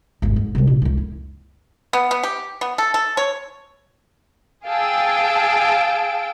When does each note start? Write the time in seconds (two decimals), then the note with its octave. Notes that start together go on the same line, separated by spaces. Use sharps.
0.22 G#1 F#2
0.36 G#2
0.55 C3 G3
0.67 A#2 D4
0.82 C#2 F#2
0.98 E4
1.93 B3
2.11 B3
2.23 G4
2.61 B3
2.78 A4
2.94 A4
3.17 C#5
4.65 G#4 F5 G5 A5 E6 D7